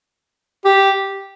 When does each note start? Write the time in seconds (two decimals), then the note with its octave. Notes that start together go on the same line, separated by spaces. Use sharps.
0.65 G4